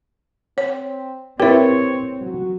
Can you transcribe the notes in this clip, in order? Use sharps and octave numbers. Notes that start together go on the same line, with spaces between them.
C4 C#5
C4 E4 G4 A#4 B4 C#5
F#3 F#4